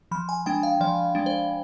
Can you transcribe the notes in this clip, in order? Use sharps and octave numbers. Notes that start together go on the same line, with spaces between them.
F3 B5
G#5
G#3 D4 G5
F5
F3 D5
G#3 D4
C5